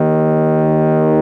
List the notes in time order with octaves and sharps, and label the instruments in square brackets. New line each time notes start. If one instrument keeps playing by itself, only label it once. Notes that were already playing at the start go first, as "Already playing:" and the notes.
Already playing: [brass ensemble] D#2 D#3